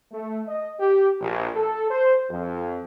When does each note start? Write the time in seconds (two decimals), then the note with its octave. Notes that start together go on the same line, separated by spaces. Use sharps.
0.12 A3
0.47 D#5
0.80 G4
1.20 A#1
1.55 A4
1.90 C5
2.30 F2